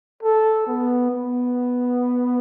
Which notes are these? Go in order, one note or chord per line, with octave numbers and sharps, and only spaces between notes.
A4
B3
B3